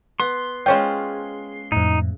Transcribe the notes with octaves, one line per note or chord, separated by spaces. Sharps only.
B3 C6
G#3 C#4 F4 C5 C#5 G5
F2 A2 D#4